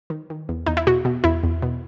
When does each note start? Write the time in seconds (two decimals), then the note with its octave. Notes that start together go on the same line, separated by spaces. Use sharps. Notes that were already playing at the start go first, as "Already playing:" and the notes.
0.10 D#3
0.30 D#3
0.49 E2
0.67 E2 D#4
0.77 E4
0.87 B2 F#4
1.05 B2
1.24 E2 E4
1.43 E2
1.62 B2